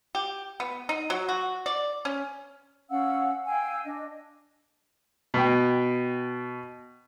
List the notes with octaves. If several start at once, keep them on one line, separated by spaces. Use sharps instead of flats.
G4
B3
D#4
F#3
F#4
D5
C#4
C#4 F5 F#5 E6
F5 G5 G#5 E6
D4 D#5
B2 G5